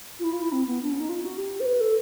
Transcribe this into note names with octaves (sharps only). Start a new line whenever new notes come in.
F4
E4
F4
E4
C4
B3
D4
C#4
D#4
F4
F#4
G4
C5
B4
A4